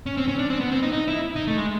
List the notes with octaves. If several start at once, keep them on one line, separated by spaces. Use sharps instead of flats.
C#4
C4
C#4
D4
C4
B3
C4
D#4
D#4
E4
D#4
A3
G#3